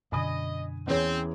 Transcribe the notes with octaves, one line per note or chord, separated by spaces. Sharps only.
F#2 B2 D3 D#5 G#5 B5 D#6
E2 E3 C4 C#4 G#4 C#5